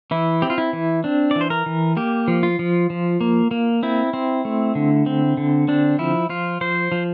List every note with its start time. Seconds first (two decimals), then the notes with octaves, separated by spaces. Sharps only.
0.11 E3 E4
0.42 C4 G4
0.50 F4
0.58 E4
0.73 E3
1.04 C4 D4
1.31 E3 D5
1.41 C5
1.50 A#4
1.66 E3
1.97 A#3 G4
2.28 F3
2.43 F4
2.59 F3
2.90 F3
3.21 A#3
3.51 A#3
3.83 C4 E4
4.14 C4
4.45 A3
4.75 D3
5.06 C4
5.37 D3
5.68 C4 D4
5.99 F3 E4
6.29 F3 F4
6.61 F3 C5
6.92 F3